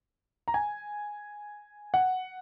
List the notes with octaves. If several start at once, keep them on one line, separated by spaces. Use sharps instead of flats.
A#5
G#5
F#5